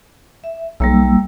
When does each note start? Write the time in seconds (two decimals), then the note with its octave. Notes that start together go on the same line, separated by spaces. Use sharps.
0.44 E5
0.80 B1 G3 A#3 E6